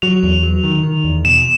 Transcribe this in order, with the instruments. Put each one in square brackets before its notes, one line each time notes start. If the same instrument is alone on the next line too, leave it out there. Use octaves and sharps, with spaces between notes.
[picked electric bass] F#3 [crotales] F7
[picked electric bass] E2
F#3
D#3
D#3
E2
[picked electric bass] B2 [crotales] E7